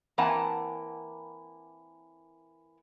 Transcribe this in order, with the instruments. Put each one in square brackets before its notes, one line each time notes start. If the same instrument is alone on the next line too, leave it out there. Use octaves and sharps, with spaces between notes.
[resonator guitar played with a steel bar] E3 A#3 C4 F#5 G#5 A5